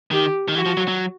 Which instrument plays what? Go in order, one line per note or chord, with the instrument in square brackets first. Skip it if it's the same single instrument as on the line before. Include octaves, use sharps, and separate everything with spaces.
[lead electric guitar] D#3 [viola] G4
[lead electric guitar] D#3
[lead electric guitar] E3 [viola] F#4
[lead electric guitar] F3
F#3
F#3